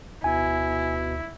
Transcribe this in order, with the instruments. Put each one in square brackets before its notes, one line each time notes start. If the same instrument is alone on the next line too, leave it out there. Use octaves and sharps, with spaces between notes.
[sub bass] D2 [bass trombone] B2 [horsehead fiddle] E4 [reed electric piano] G#5